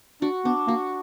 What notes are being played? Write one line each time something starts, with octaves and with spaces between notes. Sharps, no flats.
D4 F#4
B3 D4
A#3 F#4